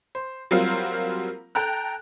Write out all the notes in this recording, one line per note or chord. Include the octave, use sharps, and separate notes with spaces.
C5
F#3 G3 A#3 C4 F4 F5
A4 G5 A5 A#5 F#6